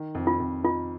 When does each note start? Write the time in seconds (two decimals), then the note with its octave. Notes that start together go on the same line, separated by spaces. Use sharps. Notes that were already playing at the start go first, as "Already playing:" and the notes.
Already playing: D#3
0.15 F2
0.27 F4
0.40 F2
0.64 D#4 F4